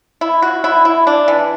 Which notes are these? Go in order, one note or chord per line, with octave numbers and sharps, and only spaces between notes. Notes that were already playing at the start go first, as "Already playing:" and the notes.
E4
F#4
E4
E4
D4
E3